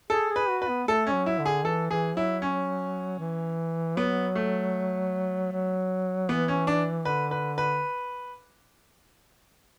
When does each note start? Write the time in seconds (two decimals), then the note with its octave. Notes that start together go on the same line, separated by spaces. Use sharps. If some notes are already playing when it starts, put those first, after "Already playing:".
0.10 G#4 A4
0.30 G#4
0.36 B4
0.49 F#4
0.62 B4
0.69 B3
0.88 A3 A4
1.07 C#4
1.13 F#3
1.26 E4
1.40 D3
1.46 G#4
1.65 E3 A4
1.91 E3 G#4
2.17 F#3 E4
2.42 C#4
3.19 E3
3.96 F#3 B3
4.35 A3
5.52 F#3
6.29 E3 B3
6.48 C#4
6.67 D4
7.05 D3 B4
7.31 B4
7.58 B4